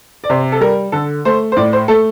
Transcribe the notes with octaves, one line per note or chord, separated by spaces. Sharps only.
D5
C3 C5
A4
G3 A#4
D3 A4
A3 C5
C5
A2 D5
C5
A3 A4